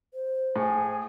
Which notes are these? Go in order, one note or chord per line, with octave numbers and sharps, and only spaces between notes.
C5
A2 G#4 G#5